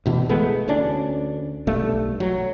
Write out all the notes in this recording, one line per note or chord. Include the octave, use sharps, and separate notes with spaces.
D2 B2 E3
G#3 A3 B3
D2 C#4 D4
B1 G2 A3
F#3